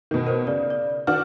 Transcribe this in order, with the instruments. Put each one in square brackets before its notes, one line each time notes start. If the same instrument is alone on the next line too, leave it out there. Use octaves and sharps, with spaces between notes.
[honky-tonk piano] B2 D#3
[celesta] A#4 C5
[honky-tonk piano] C#3 [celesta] D5
[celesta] D5
[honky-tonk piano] D#3 D4 F#4 [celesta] F6